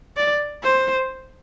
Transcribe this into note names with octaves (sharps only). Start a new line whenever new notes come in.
D5
C5